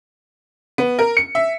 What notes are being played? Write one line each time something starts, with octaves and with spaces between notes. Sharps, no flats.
B3
A#4
C#7
E5